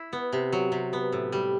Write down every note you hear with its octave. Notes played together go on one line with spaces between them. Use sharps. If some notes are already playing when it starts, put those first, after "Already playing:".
Already playing: E4
B3
C3
F#3
C3
B3
A2
G3